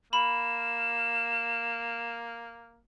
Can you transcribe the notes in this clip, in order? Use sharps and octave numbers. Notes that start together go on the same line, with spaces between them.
A#3 B5 E7